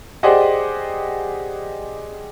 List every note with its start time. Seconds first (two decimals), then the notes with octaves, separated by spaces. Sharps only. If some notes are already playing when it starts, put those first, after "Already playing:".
0.23 G4 G#4 C5 D5 D#5 F#5